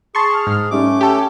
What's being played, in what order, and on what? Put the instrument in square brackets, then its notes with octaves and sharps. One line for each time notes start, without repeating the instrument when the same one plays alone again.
[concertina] G#4 [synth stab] A5 C6 C#6
[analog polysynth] F6
[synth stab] G#2
[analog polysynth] G3 C#4 D#4 [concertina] A3 D6
[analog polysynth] C#4
[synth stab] G4 A4